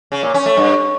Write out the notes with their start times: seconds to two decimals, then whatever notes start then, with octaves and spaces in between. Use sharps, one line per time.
0.12 C#3
0.23 A#2
0.34 C#4
0.46 A3
0.57 G2